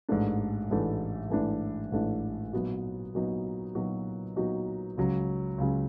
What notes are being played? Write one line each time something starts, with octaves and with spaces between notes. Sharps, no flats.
A1 G#2 E3 A3 D4
A1 G#2 E3 A3 D4
A1 G#2 E3 A3 D4
A1 G#2 E3 A3 D4
A#2 F#3 B3 D#4 F#4
A#2 F#3 B3 D#4 F#4
A#2 F#3 B3 D#4 F#4
A#2 F#3 B3 D#4 F#4
C#2 C#3 F#3
C#2 C#3 F#3